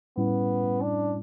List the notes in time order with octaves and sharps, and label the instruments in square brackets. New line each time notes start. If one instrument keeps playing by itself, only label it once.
[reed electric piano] A2 G3 C#4 E4 [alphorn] B3
[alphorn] D4